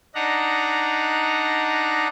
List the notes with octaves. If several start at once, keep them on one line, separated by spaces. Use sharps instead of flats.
D4 D#4 F#5 A#5